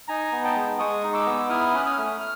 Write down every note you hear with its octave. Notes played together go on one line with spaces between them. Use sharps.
D#4 G#5 A#5
B3
G5 A5
G#3
G#3 C#6 D#6
D#4
D6 E6
B3
E4 D#6 F6
C#4 F#6
D#6 F6
A3
F6